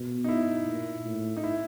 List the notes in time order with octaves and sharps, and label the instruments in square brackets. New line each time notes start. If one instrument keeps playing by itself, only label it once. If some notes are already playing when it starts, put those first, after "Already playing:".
Already playing: [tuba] B2
[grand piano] D#4
E4
[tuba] A#2
A2
[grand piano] D#4
E4